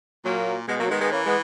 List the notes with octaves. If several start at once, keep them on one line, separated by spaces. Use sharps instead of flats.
A#2 F#3 A#3
B2 G#3 B3
F#3 A#3
D#3 G#3 B3
G#3 B3
E3 A#3 C#4
G#3 B3